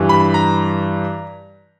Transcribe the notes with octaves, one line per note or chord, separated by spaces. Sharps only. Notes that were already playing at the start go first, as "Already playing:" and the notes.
Already playing: G2 E3 G3
B5
A#5